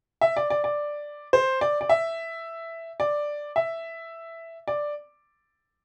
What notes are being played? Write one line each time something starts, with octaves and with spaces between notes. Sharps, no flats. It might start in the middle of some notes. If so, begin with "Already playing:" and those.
E5
D5
D5
D5
C5
D5
D5
E5
D5
E5
D5